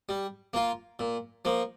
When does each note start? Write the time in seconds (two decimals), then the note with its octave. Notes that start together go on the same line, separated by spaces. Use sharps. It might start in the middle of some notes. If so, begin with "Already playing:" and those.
0.09 G3
0.54 A#3 F4
0.99 A#2
1.45 F3 A#3